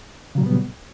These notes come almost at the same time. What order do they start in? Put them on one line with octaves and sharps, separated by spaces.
C#3 F#3 A#2 G3 B3